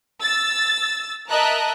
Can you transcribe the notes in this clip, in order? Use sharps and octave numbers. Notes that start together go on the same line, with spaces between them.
E6 A6
A#4 D#5 E5 A5 A#5 F#6